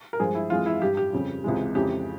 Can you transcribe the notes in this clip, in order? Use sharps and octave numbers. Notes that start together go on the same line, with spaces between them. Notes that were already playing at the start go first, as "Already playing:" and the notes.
A#4
G2 F3 G#3 G#4
E4
F2 E3 G#3 F4
E4
G2 G3 G4
G4
F2 C#3 G3
C#2 C3 E3 G#3
F2 C#3 E3 G#3 G4